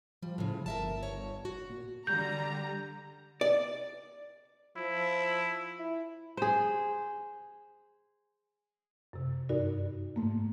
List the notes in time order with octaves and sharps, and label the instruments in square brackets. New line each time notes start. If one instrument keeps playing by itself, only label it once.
[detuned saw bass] F3 [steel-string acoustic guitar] G3
[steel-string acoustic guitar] A2 C#3
[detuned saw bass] G1 [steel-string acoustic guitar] A#4 E5 A5
[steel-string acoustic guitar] C#5
F#4
[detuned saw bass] A#2
[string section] D3 G3 A#5 [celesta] G6
[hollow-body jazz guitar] D5
[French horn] F3 [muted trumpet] E4
[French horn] E4
[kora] G#4 C5
[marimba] F#2 C3
G2 D#4 F#4 A#4 D5
G#2 A3 A#3